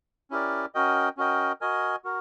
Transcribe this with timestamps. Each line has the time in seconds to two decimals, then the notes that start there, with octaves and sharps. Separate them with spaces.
0.31 C#4 E4 G4 A#4 D5
0.75 C#4 F#4 A#4 D#5 G5
1.17 C#4 F#4 A#4 D#5 G5
1.61 F#4 A#4 D#5 G#5
2.04 F#4 A#4